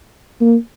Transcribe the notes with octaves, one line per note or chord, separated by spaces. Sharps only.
A#3